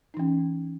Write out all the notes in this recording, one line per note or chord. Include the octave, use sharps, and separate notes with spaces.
E3 C#4 D#4